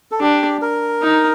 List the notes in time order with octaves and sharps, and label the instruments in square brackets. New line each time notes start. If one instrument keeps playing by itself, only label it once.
[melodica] A4
[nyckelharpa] D4 [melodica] G4
[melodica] A#4
[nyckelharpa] D#4